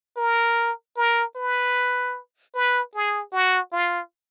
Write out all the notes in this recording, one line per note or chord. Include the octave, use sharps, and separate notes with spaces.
A#4
A#4
B4
B4
G#4
F#4
F4